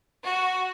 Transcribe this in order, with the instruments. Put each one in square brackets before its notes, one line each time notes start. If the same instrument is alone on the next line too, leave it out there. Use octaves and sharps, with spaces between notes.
[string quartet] F#4